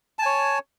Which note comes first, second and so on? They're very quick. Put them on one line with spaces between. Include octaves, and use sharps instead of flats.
A5 G#5 C#5